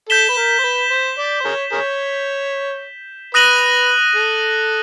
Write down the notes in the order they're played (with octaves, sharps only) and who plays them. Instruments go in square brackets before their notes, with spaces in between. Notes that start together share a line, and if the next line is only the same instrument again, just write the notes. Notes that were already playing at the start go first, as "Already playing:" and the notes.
[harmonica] A4 [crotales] G6 B6 E7 G7
[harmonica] B4
A#4
C5
B4
C5
D5
C5
G#4 A#4 C#5
G#4 A#4 C#5
[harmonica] B4 [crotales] D#6 F#6 A#6 D#7 F#7
[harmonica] A4